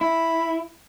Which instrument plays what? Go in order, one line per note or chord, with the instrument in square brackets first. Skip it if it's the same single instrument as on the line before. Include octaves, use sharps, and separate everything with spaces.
[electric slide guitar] E4 [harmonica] B5